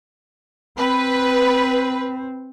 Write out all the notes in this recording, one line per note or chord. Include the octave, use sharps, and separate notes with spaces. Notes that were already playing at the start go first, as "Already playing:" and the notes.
C4 B4